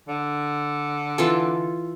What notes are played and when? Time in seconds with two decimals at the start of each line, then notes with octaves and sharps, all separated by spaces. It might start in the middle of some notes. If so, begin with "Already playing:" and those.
0.08 D3
1.18 E3 F4 A4